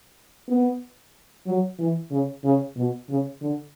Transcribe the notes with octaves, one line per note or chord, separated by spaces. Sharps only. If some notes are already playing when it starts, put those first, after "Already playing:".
B3
F#3
E3
C#3
C#3
B2
C#3
D3